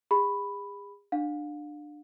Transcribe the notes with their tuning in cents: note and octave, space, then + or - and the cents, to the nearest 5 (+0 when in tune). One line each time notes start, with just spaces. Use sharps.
G#4 -40 B5 +0
D4 +20 F5 +40